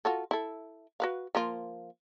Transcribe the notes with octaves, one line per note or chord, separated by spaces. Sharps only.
F4 F#4 A4
E4 A4
F#4 B4 F5
F3 A#3 F4